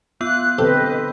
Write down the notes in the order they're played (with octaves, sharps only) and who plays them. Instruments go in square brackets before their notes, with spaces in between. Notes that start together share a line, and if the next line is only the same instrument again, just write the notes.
[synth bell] B3 E6 [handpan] F4 [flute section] F#6
[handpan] D3 C4 C5 [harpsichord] G4 A4 [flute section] B4 D#5